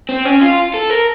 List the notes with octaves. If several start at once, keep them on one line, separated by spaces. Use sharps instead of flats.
C4
C#4
F4
A4
A#4